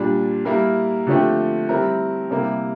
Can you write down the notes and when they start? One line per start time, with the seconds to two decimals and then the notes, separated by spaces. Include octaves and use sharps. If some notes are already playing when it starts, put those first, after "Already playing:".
Already playing: A#2 G3 D4
0.45 G3 A#3 E4 A#4
1.07 D3 F3 A3 C4 G4
1.69 G3 C4 E4 A#4
2.31 C3 G3 A#3 E4